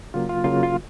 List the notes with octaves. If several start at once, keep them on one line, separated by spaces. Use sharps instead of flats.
C#3 F#3 A#3 F4
F4
C#3 F#3 A#3 F4
F#4
F4